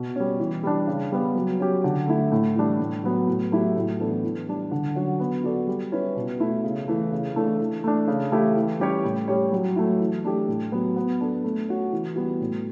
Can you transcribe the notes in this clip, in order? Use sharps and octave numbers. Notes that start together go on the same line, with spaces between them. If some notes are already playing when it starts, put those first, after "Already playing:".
Already playing: B2
G3 C#4
E3
G3 D4
C#3
G3 B3
F#3
C#4 G4
D3
A3 E4
A2
E3 G3 D4
A2
F#3 B3
A2
F#3 A3 E4 G4
A2
E3 B3 D4 A4
E3
G3 D4
D3
F#3 C#4 F#4
B3
F#4 A4 D5
G3
C#4 E4 B4
B2
A3 E4
C#3
E3 A3
C#3
E3 A3 D4 A4
E3
A3 D4
C#3
E3 A3 E4 G4
E3
G3 C#4 G4 C#5
A2
G3 C#4 G4 C#5
F#3
A3 E4
E3
A3 D4 G4
A2
F#3 B3
B3
D4 A4
A3
C#4 F#4
E3
G3 B3 F#4
A2